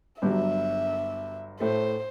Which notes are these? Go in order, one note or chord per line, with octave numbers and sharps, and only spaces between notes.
G1 G2 F#3 E5
A2 A3 C5